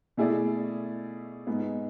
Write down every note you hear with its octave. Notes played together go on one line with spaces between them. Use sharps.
B2 A3 E4 G#4 D5
G#2 G#3 B3